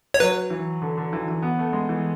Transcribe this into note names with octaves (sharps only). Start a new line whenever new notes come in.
C#5
F#3 B4
E3
D3
D3
E3
E3
B3
A3
G#3
E3